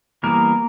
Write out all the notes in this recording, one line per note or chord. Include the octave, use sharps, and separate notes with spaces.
E3 G3 A#3 B3 A#4